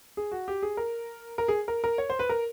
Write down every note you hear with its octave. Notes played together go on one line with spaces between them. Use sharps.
G#4
F#4
G4
G#4
A#4
A#4
G#4
A#4
A#4
C#5
C5
B4
A#4